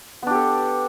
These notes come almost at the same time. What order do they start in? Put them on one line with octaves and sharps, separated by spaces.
B3 D4 G4 A4